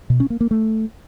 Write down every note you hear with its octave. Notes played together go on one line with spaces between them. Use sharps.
B2
C#4
A#3
A#3
A3